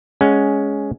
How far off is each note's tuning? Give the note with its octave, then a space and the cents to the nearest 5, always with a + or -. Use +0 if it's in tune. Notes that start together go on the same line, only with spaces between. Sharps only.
G#3 +0 C#4 +5 F#5 +0